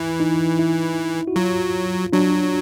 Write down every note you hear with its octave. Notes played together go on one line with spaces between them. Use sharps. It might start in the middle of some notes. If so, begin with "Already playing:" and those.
Already playing: E3 E4
D#4
E4
F#4
F#3 F4
F#3 D4